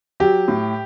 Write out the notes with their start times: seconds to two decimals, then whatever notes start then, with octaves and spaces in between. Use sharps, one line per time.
0.20 F#3 G4
0.48 A2